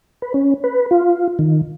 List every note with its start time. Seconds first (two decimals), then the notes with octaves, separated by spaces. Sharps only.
0.22 B4
0.34 C#4
0.64 B4
0.91 F4
1.39 D#3